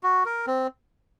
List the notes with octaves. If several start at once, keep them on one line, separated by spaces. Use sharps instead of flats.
F#4
A#4
C4